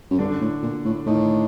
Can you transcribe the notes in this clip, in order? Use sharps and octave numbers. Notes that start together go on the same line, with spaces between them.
F#2
G2 D3 D4
A2
A#2
A2
A2 D#3 D#4